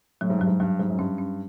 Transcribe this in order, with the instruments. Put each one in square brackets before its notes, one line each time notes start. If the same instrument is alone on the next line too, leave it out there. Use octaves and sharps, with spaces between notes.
[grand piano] A2 [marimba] F#3
[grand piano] G#2
[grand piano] G2 [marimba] F#3
[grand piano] G#2
[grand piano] G2 [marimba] F#3
[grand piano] G#2 [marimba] F#3
[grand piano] F#2
[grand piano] G2 [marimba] C#4
[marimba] C#4